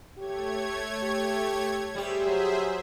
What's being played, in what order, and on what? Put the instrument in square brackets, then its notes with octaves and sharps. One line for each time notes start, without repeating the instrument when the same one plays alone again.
[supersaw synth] A3 C#5 G#6 [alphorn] G4
[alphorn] G4
[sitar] G3 G4 [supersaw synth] G#4 C5 E5
[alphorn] F#3